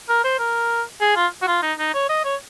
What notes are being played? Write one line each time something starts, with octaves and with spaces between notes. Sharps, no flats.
A#4
C5
A#4
G#4
F4
F#4
F4
D#4
D#4
C#5
D#5
C#5